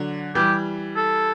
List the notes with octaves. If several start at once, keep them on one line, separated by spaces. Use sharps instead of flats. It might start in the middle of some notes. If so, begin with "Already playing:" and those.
Already playing: D3 F#3
E3 G3 G4
A4